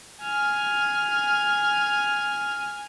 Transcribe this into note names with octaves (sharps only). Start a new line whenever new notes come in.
G#5 F6